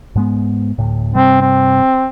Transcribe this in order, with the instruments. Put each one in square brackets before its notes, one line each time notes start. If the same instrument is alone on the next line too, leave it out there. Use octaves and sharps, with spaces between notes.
[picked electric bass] G#2 G#3 B3
D2 A2
[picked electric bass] G2 C3 G3 [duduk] C4
[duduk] C4